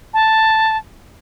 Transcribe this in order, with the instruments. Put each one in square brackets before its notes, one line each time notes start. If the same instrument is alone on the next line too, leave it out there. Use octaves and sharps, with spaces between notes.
[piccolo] A5